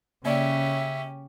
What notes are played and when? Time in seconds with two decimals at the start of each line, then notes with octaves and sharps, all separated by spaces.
0.25 C#3 A#3 C#4 G4 D5 E5